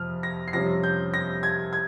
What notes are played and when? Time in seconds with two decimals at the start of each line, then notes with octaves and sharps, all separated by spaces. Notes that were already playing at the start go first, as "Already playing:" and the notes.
Already playing: F2 C3 F3 F6
0.23 A#6
0.48 C7
0.53 F2 C3 G3 C#4 A#6
0.83 G6
1.14 A#6
1.43 G#6
1.73 G#6